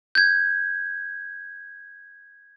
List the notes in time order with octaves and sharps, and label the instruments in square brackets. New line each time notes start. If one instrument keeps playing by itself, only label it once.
[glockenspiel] G6 G#6